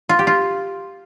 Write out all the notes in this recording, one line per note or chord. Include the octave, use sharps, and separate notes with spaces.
F4
G4
F4